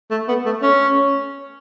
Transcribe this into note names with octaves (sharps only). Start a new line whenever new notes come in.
A3
B3
A3
C#4